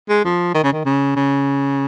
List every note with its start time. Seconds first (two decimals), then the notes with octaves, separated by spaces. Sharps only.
0.09 G#3
0.25 F3
0.54 D#3
0.64 C#3
0.73 D#3
0.85 C#3
1.16 C#3